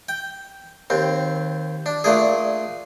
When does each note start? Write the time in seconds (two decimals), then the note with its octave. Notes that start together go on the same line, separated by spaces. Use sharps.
0.09 G5
0.90 D#2 C4
1.86 D4
2.04 A#2 A3 D4 G#4